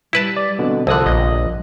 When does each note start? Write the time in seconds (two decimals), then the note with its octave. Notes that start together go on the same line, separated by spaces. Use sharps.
0.13 G3 E4 B4 A5
0.37 D5
0.59 B2 D3 C4
0.87 C2 D3 F3 A4 D#6 F#6
1.06 A#1 D#5